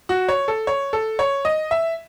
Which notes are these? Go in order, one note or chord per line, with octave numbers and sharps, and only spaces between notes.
F#4
C#5
A4
C#5
A4
C#5
D#5
E5